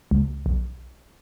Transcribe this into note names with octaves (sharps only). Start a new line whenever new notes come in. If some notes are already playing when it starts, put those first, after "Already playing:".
C#2
B1